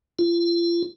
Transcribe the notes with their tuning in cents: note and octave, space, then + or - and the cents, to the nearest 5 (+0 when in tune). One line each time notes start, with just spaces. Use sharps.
F4 -35